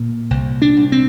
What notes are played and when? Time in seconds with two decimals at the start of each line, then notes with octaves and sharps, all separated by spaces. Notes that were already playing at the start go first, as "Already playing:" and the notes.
Already playing: A#2
0.31 C2
0.62 D4
0.76 C2
0.92 C4